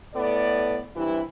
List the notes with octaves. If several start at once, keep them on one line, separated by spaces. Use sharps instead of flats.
A2 B3 A4 D5
G2 C3 E3 E4